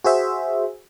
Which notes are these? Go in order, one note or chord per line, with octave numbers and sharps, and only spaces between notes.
F#4 G#4 C5 E5